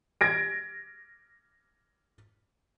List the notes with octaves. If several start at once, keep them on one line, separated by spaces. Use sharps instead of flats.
G#6 A#6 D7